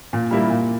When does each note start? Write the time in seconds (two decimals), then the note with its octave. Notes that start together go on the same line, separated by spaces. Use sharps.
0.13 A#2
0.31 G3 A#3 E4
0.50 A#2